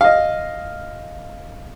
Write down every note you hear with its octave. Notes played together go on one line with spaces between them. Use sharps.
D#5 F5